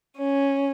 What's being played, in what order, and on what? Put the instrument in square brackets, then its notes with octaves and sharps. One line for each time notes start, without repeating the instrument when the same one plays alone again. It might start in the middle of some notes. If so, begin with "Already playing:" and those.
[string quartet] C#4